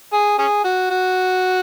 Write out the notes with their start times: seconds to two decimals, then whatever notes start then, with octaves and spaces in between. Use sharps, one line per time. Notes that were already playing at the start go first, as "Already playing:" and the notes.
0.13 G#4
0.38 C#4 G#4
0.64 F#4
0.90 F#4